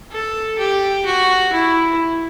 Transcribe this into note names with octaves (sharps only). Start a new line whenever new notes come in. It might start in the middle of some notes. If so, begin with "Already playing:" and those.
A4
G4
F#4
E4